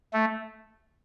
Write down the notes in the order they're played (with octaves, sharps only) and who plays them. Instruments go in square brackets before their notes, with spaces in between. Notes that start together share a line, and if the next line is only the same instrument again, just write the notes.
[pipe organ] A3